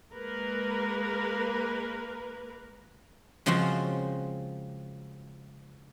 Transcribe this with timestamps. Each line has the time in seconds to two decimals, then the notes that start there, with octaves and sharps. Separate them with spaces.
0.14 G#3 A#3 A#4 B4
3.46 C#3 F3 G#3 C4 F4 F#4